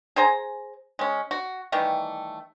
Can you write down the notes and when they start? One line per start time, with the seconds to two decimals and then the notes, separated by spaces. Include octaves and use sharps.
0.16 G#4 C5 G#5 A#5
0.99 G#3 C#4
1.31 F#4
1.72 D#3 E3 G3 A3